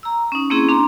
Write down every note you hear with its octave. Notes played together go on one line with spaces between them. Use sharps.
A#5 E6
C#4 D#4
A#3 C4 C#4 E4 G#4
D4 A#5 C6